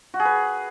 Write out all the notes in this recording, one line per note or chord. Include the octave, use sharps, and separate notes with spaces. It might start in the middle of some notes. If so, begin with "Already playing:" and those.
F#4
G#4
B4